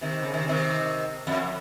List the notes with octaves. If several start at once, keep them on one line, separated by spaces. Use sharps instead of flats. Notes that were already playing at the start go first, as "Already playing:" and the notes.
C3 D#3
C#3
C3 D#3
C3 D#3
F2